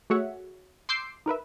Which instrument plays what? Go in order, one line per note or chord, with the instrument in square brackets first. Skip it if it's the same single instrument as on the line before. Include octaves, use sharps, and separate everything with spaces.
[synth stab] A3 F#4 G#4 C#5 E5 F#5
C6 D6 E6 G6 C7
D#4 A#4 B4 E5